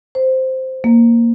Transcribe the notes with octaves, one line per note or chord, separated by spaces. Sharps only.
C5
A#3